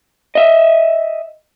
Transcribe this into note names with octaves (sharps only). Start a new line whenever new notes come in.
D#5 E5